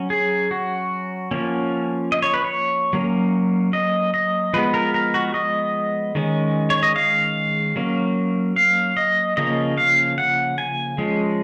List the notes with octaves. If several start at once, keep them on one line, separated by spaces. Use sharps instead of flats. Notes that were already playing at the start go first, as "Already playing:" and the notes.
Already playing: F#3 C#4
G#4
F#4
F3 A#3 C#4
D#5
C#5
B4
C#5
F#3 A#3 C#4
D#5
D#5
F3 G#3 B3 B4
A#4
A#4
F#4
D#5
D#3 G#3 C#4
C#5
D#5
F5
F#3 A#3 C#4
F5
D#5
C#3 F3 A#3 C#4 D#5
F5
F#5
G#5
F3 G#3 C#4